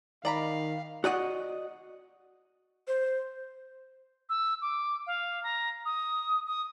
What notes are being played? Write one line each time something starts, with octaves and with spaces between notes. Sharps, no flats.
D#3 D5 F5 A#5 B5
F#4 D5 D#5 F#5
C5
E6
D6
F5
A#5
D#6
D#6